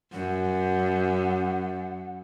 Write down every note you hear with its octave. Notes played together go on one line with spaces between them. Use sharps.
F#2 F#5